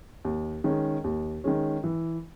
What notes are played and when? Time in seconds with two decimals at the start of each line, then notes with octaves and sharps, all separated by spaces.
0.25 D#2
0.64 D#3 G#3 C#4
1.04 D#2
1.44 D#3 G#3 C#4
1.84 E3